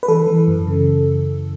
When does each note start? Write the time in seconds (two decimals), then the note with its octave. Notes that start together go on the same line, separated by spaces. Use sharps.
0.03 B4
0.08 E3 A4
0.27 E3
0.48 F#2
0.67 C#3